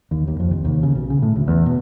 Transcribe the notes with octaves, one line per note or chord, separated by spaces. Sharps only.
D#2
D#2
F2
C2
D#2
C#3
B1
C#3
A2
D2
E2
B2